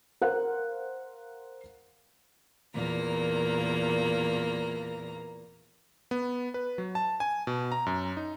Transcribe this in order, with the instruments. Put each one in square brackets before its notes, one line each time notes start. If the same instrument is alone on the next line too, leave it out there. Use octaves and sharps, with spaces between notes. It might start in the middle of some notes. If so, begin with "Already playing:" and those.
[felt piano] A#4 C5 F5 F#5 F#6
[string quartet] E2 A#2 A#3 A#5
[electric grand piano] B3
B4
F#3
A5
G#5
B2
A#5
F#2
D#4